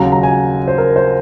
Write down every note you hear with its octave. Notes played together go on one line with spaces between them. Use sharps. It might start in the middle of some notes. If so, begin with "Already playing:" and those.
Already playing: D#2 C#3 F#3 A#5
A#5
G#5
C5
A#4
C5